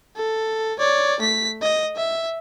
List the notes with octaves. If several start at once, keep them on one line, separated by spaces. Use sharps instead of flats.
A4
C#5 D5
A3 B6
D#5
E5